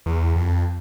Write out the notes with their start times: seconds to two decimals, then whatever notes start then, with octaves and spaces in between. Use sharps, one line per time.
0.06 E2
0.36 F2